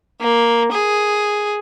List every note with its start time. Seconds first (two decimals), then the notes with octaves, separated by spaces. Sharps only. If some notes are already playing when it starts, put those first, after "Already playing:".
0.21 A#3
0.72 G#4